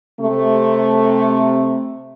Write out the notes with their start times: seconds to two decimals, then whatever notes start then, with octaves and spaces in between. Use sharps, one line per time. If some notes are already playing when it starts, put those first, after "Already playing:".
0.20 C3 A3